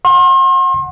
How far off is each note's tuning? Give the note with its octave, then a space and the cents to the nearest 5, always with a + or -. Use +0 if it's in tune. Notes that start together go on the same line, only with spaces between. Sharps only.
F#5 -10 C6 +40